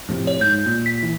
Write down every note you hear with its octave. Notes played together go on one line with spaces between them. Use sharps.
F2 A2 C3
C#5
G#2 G6
A#2
B6
E3